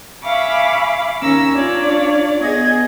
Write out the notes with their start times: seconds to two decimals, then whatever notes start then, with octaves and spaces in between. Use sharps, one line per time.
0.22 E5 F5 G#5 B5 C#6 D6
1.21 D#2 C#4 A#5 E6 A#6
1.52 D4 F4 C#5 D5
2.40 B3 G#4 D#5 G#6 A#6